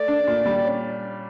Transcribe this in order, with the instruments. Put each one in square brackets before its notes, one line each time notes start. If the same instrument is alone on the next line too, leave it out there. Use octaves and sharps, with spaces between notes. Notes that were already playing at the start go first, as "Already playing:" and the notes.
Already playing: [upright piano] A3 [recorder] D5
[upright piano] D4
A#2
G3
C#4